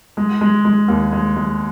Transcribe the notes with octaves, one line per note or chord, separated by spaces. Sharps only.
G#3
G#3
G#3
D#2
G#3
G#3